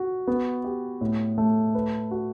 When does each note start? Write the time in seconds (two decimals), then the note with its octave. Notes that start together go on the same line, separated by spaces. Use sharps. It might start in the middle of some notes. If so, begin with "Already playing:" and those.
Already playing: F#4
0.27 B3
0.64 G4
1.01 A2
1.38 A3
1.75 B4
2.11 F#4